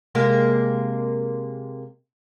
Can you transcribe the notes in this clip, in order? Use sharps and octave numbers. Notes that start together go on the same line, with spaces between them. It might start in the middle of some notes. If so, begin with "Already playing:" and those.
C3 G#3 A#3